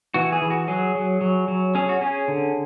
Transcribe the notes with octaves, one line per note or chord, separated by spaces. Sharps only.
E3 F#4
G#4
E3
F#4
F#3 G#4
F#3
F#3
F#3
C#4 G#4
F#4
C#4 G#4
D3